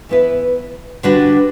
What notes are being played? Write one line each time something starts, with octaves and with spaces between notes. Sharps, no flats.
E3 B3 E4 B4
D3 G3 D4 F#4 B4